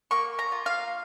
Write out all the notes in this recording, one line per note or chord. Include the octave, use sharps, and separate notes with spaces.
A#3 C#6
A#5
F4
F5